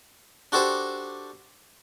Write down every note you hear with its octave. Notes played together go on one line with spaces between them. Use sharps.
D4 F#4 G4 A4 C5